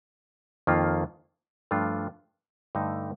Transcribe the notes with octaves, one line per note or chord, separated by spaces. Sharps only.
F2 D#3 A#3 F4
G2 F3 A3 D4 F4
G2 D3 A3 D#4